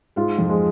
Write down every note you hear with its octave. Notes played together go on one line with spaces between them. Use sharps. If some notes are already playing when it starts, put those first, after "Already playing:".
G#2 G#3 F4
F2 F3
G#3